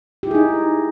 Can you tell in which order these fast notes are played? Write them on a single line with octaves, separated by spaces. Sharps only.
G4 E4 G#4 D#4